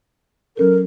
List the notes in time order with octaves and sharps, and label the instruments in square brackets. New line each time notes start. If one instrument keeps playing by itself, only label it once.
[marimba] F#3 C#4 A4 [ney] A#4